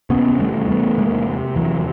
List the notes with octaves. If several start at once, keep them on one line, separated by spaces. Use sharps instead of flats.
C3 B3 C#4
E2 G3 A3
E2 A3 B3
C3 G#3 A#3
C3
E2 E3 F#3